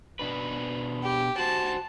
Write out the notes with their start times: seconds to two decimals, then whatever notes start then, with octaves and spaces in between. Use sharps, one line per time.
0.19 B2 D4 B4
1.03 G4
1.38 F#4 C5 A5